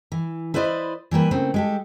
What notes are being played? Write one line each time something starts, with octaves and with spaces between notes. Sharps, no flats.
E3
E4 B4 C5 D5 D#5
E3 G3 A#3 B4
C#3 A3 A#3 C4
G#3 G4 A4